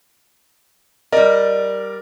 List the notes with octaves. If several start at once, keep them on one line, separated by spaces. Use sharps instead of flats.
G3 A#4 D5 D#5